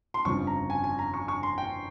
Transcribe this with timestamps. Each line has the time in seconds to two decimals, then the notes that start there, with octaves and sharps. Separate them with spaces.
0.14 C6
0.25 G1 F2 C#3 F3 C#6
0.47 A#5
0.70 G#5
0.84 G#5
0.99 A#5
1.14 C#6
1.28 C#6
1.43 C6
1.58 G5